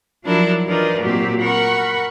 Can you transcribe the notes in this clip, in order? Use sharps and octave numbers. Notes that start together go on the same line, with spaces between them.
F3 F#3 D4 E4 A#4
E3 D4 D#4 F4 A#4 D5
A#2 F#3 A#3 C4 G4
A#4 F#5 B5 C#6